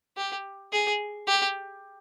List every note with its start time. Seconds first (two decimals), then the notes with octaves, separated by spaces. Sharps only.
0.17 G4
0.72 G#4
1.27 G4